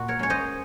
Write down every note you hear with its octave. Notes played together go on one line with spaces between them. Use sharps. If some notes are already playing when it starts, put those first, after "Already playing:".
Already playing: A#2 F#4
A#4 C#5
G#3 C#4 C#5
C5 D#5